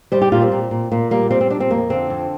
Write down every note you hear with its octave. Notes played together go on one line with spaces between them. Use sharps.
G3 C5
G4
A#2 F4
C4
A#2
A#2
A#2 A#3
G3 A#3
G3 C4
C4
A#2 D4
C4
F2 A#3
D3 C4
F2